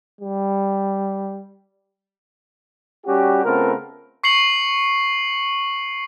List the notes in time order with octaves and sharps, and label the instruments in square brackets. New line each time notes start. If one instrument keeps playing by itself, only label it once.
[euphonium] G3
[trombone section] G3 C#4 F#4 G4
C#3 A3 B3 C4 F4 A#4
[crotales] C#6 C7 C#7 F#7